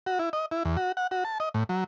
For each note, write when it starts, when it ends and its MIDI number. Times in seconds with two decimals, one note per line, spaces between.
0.06 0.19 66
0.19 0.29 64
0.33 0.46 75
0.51 0.63 64
0.65 0.77 40
0.77 0.92 66
0.97 1.07 78
1.11 1.24 66
1.25 1.38 81
1.40 1.49 75
1.54 1.64 45
1.69 1.84 54